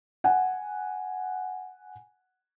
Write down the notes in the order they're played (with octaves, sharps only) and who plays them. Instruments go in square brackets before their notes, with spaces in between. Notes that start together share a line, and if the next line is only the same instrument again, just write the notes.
[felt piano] F#5 G#5